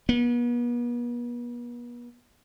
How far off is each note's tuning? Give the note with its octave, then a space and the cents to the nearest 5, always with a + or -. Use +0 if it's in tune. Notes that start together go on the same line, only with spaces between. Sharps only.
B3 -40